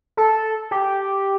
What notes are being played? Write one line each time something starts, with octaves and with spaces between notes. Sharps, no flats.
A4
G4